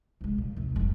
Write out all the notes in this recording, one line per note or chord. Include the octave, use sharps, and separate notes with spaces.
C3 G#3
A#2
D#2 C3
F1 G3